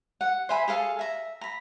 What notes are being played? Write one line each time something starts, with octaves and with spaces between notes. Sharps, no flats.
F#5
C5 E5 G#5 B5
G#4 A4 F5 A5
E5 A#5
A#5 B5